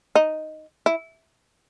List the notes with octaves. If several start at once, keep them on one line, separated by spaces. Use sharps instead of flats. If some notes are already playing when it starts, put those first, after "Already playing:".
D#4
E4